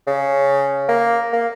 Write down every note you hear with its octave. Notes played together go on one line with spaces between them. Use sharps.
C#3
A#3
A#3